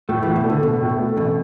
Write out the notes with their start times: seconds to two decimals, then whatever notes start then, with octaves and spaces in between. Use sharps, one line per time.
0.09 A2 A3
0.23 A2 E3
0.36 B2
0.44 A3
0.50 D3
0.63 B2 A3
0.81 A2
0.99 A3
1.17 A1 B2